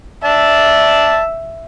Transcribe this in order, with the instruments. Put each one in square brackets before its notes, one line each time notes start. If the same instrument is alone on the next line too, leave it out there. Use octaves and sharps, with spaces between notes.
[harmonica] D5 A5 [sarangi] E5